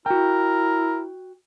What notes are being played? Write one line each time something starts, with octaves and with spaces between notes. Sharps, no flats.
E4 F#4 A#4 G5